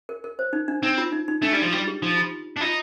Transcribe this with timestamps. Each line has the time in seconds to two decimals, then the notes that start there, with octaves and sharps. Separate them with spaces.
0.09 A#4
0.24 A#4
0.39 C5
0.53 D#4
0.68 D4
0.83 C4 D#4
0.98 F4
1.12 D#4
1.28 D#4
1.42 A3 D4
1.53 G3 D#4
1.62 F3
1.72 G3
1.77 F4
1.88 G4
2.02 F3 D#4
2.17 F4
2.57 D4
2.61 D#4 F4